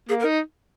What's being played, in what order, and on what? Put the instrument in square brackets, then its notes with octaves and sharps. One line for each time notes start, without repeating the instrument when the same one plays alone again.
[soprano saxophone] A#3 [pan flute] G#4
[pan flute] A#4
[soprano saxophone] D#4